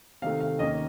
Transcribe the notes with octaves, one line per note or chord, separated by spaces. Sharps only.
C3 D#3 A3 F5
F5
D#2 D#3 A#3 C#4 D#5